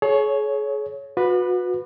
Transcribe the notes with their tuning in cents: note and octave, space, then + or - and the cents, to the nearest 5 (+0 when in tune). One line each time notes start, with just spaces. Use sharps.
G#4 +40 C#5 +0
F#4 -35 B4 +0 D6 +40